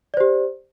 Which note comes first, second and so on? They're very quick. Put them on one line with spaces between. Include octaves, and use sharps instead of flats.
D5 C5 G4